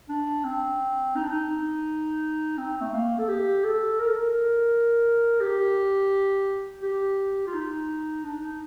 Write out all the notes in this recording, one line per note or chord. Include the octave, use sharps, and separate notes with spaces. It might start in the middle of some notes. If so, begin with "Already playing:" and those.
D4
C4
D#4
D4
D#4
C4
A3
A#3
A4
G4
A4
A#4
A4
A#4
G4
G4
F4
D#4
D4
D#4